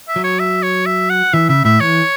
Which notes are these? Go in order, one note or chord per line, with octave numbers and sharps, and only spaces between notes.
E5
F#3
C#5
E5
C#5
E5
F#5
E3 E5
C#3 E5
A2 E5
E3 C#5